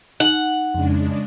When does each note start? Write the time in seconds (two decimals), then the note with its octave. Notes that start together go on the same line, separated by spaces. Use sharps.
0.20 D#4 F#5 F#7
0.75 F2 C#3 G#3 D4